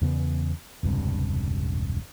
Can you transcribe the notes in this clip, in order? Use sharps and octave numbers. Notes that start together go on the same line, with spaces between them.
E2 C#3 B3
E1 C#2 G2 C3